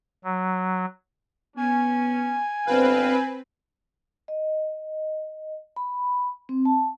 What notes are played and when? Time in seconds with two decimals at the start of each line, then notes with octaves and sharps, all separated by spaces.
0.24 F#3
1.57 B3 C#4 G#5
2.67 G1 C4 B4 F5
4.28 D#5
5.76 B5
6.49 C4
6.65 A5